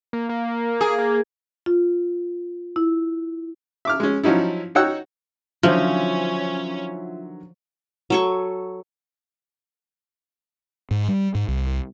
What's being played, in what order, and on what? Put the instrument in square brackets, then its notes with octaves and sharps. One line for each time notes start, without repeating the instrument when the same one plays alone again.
[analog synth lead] A#3
A#3
[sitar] G#4
[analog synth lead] A#3
[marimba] F4
E4
[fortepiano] E5 D6 F6
G#3 C#4
F3 F#3 C#4 D#4 E4
D#4 F#4 C#5 F#5 G5 E6
[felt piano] D3 D#3 F#3 [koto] F3 [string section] C#4 [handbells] F4 E5
[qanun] F#3 A4 C#6
[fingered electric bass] G#2
G3
G#2
C2